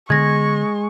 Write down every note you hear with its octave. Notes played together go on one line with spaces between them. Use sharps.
D3 G#3 B3 C#6 G#6 A#6